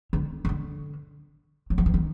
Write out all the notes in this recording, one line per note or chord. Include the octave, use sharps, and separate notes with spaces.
D3
D#3
D3
F#3
F3
E3
D#3